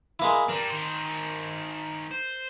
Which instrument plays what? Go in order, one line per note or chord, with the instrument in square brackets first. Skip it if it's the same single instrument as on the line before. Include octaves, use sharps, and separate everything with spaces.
[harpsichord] G#3 A#3 E4
[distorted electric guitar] G3 D4 [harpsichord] A#4
[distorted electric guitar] D#3 C5
C5